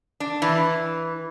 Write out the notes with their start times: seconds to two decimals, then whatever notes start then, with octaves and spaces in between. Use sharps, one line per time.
0.20 D4
0.42 E3